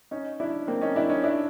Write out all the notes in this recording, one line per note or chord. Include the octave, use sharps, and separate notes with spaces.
C#4 D#4
D4 E4
A#3 C4
C#4 D#4
D4 E4
C#4 D#4
D4 E4